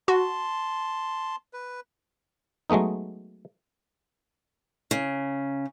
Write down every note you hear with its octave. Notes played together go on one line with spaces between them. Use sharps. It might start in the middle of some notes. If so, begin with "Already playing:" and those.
F#4 A5 C6
B4
F#3 G#3 A3 B3 D#4
C#3